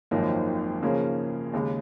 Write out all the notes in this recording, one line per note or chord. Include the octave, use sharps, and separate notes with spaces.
G#1 F#2 F3 A#3 D#4
C#3 F3 A#3 C#4 G#4
D#2 C#3 G#3